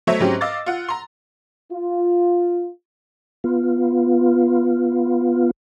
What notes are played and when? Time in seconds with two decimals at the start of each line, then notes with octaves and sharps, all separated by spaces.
0.07 F#3 A3 C5 C#5 D#5 E5
0.20 G#2 F#3 C4 C#4 G4
0.41 D#5 F5 D6 E6 A6
0.66 F4 F#5
0.89 A#5 C6
1.71 F4
3.44 B3 F4